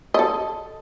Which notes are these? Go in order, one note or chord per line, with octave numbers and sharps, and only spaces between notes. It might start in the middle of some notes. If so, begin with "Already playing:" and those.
A4 D#5